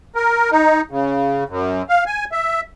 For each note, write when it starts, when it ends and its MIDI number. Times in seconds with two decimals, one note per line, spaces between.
0.15 0.50 70
0.51 0.81 63
0.91 1.44 49
1.49 1.82 42
1.89 2.04 77
2.06 2.25 80
2.32 2.61 76